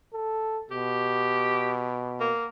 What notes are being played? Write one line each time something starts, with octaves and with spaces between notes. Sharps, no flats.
A4
B2 G4
A#3